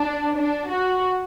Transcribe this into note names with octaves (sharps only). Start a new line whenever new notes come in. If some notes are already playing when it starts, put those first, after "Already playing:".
Already playing: D4
D4
F#4